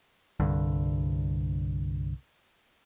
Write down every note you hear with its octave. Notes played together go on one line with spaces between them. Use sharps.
C2 G2 D3